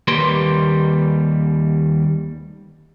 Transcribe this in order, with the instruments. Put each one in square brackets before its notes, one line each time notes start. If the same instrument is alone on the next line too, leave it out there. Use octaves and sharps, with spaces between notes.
[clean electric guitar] D#2 G3 A#3 G4 B4 C6